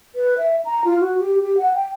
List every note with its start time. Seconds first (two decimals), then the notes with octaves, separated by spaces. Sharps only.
0.15 B4
0.38 E5
0.65 A#5
0.85 F4
1.00 F#4
1.19 G4
1.41 G4
1.57 F#5
1.74 G5